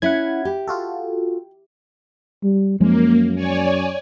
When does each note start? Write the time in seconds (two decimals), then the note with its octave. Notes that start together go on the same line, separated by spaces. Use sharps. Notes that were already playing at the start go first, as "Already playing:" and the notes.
0.02 C#4 E4 F#5 B5 G#6
0.45 G4
0.68 F4 F#4 A4
2.43 G3
2.80 F#2 F3 G#3 A#3
3.35 C#5 D5 G#5